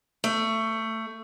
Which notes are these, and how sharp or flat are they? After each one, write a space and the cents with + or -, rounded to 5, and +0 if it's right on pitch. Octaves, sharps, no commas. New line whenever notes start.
A3 +20